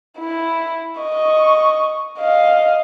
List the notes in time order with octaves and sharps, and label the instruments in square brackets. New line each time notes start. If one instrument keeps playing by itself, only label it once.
[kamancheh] E4
D#5 C#6
D#5 F5